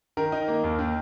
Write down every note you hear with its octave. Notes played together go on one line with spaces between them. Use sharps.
D#3 A#4
D#4
A#3
D#2
D#3